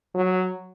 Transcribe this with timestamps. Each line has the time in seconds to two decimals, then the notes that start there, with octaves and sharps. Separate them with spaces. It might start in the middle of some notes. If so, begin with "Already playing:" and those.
0.15 F#3